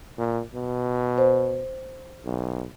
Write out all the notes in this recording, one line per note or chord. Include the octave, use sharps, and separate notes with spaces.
A#2
B2
C5
B1